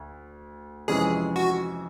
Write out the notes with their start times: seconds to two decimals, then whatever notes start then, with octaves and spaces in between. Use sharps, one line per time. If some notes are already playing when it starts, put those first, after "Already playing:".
Already playing: D2
0.88 F2 C3 E3 G#3 C#4 G#4
1.36 F#4